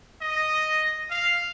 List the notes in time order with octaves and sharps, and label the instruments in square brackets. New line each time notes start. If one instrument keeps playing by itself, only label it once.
[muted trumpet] D#5
F5